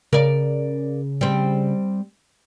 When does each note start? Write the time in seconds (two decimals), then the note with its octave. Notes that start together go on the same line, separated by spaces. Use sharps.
0.13 C#3 A#4 D5
1.21 G3 C4